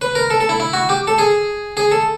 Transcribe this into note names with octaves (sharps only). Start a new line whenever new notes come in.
B4
A#4
A4
A4
E4
E4
F#4
G4
A4
G#4
G#4
A4